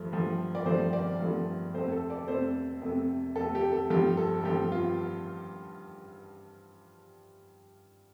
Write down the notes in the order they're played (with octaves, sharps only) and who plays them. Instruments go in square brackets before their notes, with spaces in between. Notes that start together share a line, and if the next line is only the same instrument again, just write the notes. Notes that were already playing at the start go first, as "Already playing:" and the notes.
Already playing: [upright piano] G2 F3 A3
G2 F3 A3
D5
G2 F3 A3 C5
D5
G2 F3 A3
F2 C3 A3 C5
A4
D5
F2 C3 A3 C5
F2 C3 A3
F2 C3 A3 A4
G4
A4
G2 F3 A3 G4
A4
G2 F3 A3 G4
F4